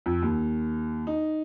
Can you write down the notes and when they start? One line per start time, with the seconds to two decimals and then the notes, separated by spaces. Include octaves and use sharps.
0.06 F2
0.22 D#2
1.07 D#4